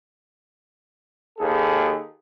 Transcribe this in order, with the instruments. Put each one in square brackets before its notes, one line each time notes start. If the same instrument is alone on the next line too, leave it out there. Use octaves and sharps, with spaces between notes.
[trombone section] D#2 G#4 A4